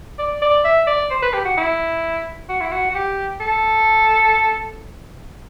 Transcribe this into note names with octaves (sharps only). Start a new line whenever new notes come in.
D5
D5
E5
D5
C5
B4
G4
F#4
E4
F#4
E4
F#4
F#4
G4
A4